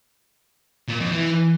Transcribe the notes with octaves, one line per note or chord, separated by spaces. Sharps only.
A#2
F2
E3